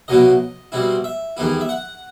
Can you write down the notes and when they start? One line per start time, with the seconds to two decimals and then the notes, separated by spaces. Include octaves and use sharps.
0.08 C2 B2 F#3 B3 E4 D#5
0.72 B2 G3 C4 E4
1.04 E5
1.37 E2 D#3 G3 B3 E4
1.61 E5
1.69 F#5